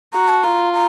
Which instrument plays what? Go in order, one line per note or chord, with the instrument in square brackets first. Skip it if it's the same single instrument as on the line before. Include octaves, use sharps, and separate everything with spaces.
[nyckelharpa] F#4 [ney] A#5
[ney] A5
[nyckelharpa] F4 [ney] A#5
[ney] A#5